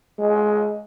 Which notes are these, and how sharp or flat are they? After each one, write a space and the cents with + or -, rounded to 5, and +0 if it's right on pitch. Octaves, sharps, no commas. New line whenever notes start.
G#3 +20